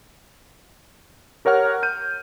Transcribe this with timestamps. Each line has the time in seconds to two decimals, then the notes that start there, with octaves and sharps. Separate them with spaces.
1.45 G4 A#4 C#5 F#5 F6
1.83 G6 D#7